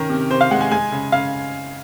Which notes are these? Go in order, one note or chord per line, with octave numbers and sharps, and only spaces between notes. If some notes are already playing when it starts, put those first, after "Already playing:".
Already playing: D#3 C#4 A#4
C3
C3 C5
F5
G#3 F#5
G#5
G#3 G#5
C#3
C#3 F5